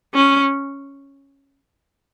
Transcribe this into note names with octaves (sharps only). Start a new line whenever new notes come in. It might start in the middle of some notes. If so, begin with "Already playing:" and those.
C#4